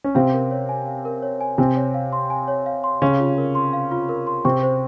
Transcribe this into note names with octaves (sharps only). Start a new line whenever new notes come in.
C#4
C3 C4 F5
A#4
C#5
G#5
F5
A#4
C#5
G#5
C3 C4 G#5
C#5
F5
C6
G#5
C#5
F5
C6
C#3 C#4 F5
F4
A#4
C6
F5
F4
A#4
C6
C3 C4 C#6
C5